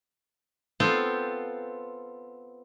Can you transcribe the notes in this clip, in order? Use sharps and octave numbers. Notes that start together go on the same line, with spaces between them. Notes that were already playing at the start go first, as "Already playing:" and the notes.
B3 C4 F4 A4 C5